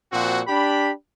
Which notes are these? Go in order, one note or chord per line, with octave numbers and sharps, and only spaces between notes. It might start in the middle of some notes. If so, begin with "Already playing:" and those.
A#2 F3 C4 F#4
D4 G4 B5